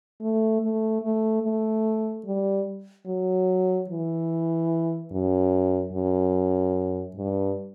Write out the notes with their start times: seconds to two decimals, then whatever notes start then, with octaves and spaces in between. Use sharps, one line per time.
0.21 A3
0.61 A3
1.03 A3
1.43 A3
2.25 G3
3.06 F#3
3.89 E3
5.12 F#2
5.93 F#2
7.16 G2